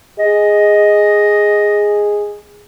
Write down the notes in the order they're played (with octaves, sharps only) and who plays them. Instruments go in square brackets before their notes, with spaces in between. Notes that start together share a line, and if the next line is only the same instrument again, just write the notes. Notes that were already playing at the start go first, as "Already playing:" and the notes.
[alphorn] G#4 [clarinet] D#5